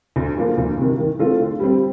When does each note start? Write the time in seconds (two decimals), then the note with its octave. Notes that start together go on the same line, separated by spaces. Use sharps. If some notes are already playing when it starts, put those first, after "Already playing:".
0.16 D2
0.37 D3 F3 A#3
0.58 D2
0.78 C3 D#3
0.98 D#3
1.19 A3 C4 F4 A4
1.39 D3
1.60 G3 C4